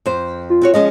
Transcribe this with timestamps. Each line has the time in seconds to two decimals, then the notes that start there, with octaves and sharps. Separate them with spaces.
0.06 F2 C5
0.50 F4
0.61 C4 F#4 C#5
0.74 F3 G#3 C#4 D#5